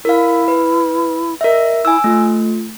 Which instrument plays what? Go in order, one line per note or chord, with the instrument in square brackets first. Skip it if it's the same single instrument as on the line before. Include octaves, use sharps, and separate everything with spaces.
[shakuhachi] E4 [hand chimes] A#4 F5
[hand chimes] B4
[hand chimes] A#4 E5 [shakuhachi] D#5
[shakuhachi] E4 [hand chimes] G#5 E6
[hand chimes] A3 [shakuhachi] F4